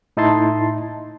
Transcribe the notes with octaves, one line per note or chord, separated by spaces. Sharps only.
A2 D#4 E4 A5 C6